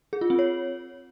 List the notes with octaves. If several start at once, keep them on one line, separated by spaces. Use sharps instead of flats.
G#4
F4
C4
C#5